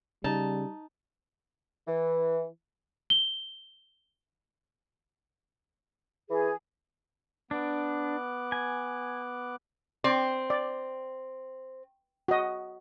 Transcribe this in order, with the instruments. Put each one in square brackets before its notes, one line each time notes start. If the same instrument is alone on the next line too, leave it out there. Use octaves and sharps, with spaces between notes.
[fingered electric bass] C#3 [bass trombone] G3 [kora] D#4 [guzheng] A5
[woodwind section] E3
[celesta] G7
[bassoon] E3 [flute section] G#4
[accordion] B3 D6 F#6 [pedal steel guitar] D4
[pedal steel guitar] G#5
[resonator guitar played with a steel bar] C4 [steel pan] D5
[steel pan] D5
F#4 D#5